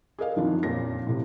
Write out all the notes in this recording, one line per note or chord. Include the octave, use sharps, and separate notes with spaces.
G#4 A#4 D#5 F5
F#2 D#3 F3 C4 D4 E4
F2 A#2 A#3 C#4 A#6
A2 C3